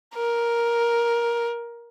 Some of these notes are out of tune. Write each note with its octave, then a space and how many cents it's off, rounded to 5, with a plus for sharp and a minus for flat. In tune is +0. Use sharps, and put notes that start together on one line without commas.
A#4 +10